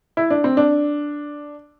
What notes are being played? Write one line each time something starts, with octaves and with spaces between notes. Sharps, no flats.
E4
D4
C4
D4